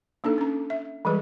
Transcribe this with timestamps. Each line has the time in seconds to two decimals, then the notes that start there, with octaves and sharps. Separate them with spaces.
0.24 A#3 D4 D#4 A4
0.38 C#4 A#5
0.70 E5
1.05 E3 G3 G#3 G#4 B4